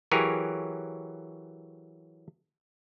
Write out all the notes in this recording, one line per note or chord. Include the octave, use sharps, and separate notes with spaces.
E3 F#3 G4 G#4 A#4 C#5